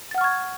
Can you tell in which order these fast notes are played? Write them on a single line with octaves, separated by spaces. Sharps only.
A6 F#5 F6 C#6 G#6